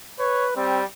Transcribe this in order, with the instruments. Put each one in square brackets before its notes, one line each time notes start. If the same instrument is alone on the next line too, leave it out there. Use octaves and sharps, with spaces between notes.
[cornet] B4 [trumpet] C#5
[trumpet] G3 [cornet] C4